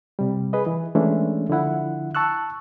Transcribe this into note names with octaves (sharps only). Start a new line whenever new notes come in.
C3 G3
G#4 B4 D#5
E3
E3 G#3 A3 C#4 D4 E4
D3 F3 E4 F#5
A5 C#6 E6 F#6